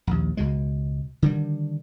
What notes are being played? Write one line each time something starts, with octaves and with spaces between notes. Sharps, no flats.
A#1 D#2
C#2 B2 G#3
D3 D#3 G3